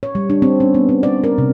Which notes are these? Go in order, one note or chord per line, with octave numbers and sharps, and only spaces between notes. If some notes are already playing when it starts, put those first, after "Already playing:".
C#5
G3
D4
C4
C#4
B3
C4
D5
A#4
C3